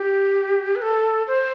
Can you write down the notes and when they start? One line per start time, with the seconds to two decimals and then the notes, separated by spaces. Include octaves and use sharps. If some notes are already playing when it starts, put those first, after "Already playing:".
Already playing: G4
0.76 B4
0.82 A4
1.27 C5